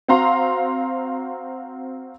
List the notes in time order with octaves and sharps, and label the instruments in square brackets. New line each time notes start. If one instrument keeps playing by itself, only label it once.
[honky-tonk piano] C4 F#4 F5 A#5 C6